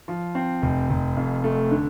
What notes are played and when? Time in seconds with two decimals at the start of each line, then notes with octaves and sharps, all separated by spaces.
0.08 F3
0.35 C4
0.62 F1
0.90 F1
1.17 F2
1.44 A3
1.71 D3